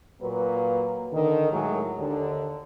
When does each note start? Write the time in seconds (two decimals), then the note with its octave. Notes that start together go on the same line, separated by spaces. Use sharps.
0.22 A#2 F#3 A#3 B4
1.13 D3 D#3
1.52 A2 F#3 G#3 G#4
1.98 D#2 D3